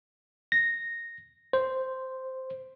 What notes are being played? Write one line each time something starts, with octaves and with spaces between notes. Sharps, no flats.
A#6
C5